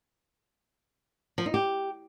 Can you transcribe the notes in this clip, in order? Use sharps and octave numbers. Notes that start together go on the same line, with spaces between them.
F3
D#4
G4